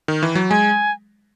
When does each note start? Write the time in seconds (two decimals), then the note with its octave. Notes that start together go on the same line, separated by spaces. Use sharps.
0.08 D#3
0.23 E3
0.35 F#3
0.50 G#3 G#5